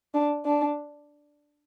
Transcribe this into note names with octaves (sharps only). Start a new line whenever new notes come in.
D4
D4